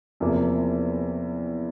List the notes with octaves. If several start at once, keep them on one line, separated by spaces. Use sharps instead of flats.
E2 C3 F3 A#3